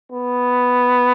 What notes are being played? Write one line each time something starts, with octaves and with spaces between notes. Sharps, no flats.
B3